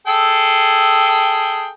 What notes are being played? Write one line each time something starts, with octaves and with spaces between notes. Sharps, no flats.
G#4 A4 G5